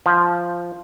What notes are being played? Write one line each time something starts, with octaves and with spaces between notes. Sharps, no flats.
F3